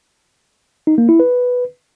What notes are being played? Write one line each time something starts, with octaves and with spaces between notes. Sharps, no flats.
D#4
A#3
E4
B4